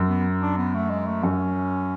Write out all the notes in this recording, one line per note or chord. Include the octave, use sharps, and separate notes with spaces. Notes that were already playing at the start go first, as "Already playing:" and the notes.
Already playing: F#2
B3
D4
B3
A3
G#3
A3
F#2 C#4